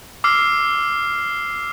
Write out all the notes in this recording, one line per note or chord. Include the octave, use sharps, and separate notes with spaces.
D6 E6 F6 C7